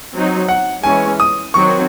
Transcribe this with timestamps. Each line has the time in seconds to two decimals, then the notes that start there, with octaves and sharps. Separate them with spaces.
0.13 F#3 C4 D#4
0.49 F#5
0.83 E3 G#3 C#4 G#5
1.20 D#6
1.54 D#3 F#3 C4 F#4 C#6